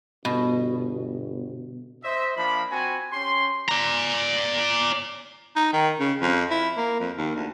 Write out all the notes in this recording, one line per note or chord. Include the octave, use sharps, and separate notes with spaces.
G1 B2
C5 D#5 E5
F3 A#3 D4 B5
C4 F#4 G#5
C#4 G4 C6
D5 A#5
D#4
D#3
C#3
F2
E4
A#3
F2
D#2
D2